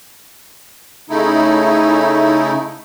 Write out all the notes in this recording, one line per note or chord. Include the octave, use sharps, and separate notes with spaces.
C#3 A3 D#4 E4